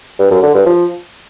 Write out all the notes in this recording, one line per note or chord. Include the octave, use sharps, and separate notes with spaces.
G2
F#2
D3
G2
F3